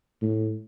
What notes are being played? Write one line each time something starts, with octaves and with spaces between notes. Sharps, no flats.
A2